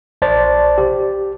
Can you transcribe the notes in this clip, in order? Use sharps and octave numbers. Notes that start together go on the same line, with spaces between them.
A#1 C5 D5 A5 A6
G4